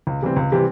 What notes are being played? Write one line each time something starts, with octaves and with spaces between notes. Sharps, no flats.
C#2
C3 E3 G3 C4
C#2
C3 E3 G3 C4